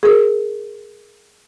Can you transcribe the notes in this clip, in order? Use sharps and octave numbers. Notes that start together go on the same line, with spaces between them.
G#4 A#4